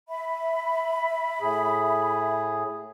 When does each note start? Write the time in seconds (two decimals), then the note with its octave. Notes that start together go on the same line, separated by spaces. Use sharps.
0.09 E5 B5
1.41 A2 G#4